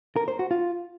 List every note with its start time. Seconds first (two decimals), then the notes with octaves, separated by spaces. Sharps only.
0.16 A#4
0.28 C5
0.39 F#4
0.51 F4